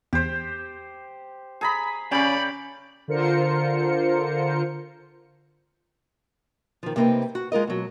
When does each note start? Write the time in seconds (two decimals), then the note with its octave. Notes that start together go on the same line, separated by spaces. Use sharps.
0.13 E2 G4 C5
1.61 G#4 A#5 B5
2.12 C#3 C#4 G4 D5 B5
3.08 D3 F4 A#4 C5 C#7
6.83 D#3 F3
6.96 C3 A#3 C4 D#4 B4
7.35 F#4
7.52 G#3 F4 A#4 D#5
7.67 B2 F#3